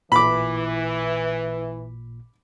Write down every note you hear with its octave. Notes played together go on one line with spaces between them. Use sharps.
A1 A#2 E3 B5 D6